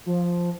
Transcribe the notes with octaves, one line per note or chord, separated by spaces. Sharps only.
F3